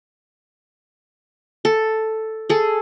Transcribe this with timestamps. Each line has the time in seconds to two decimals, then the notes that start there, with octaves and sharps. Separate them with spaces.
1.65 A4
2.49 G#4 A4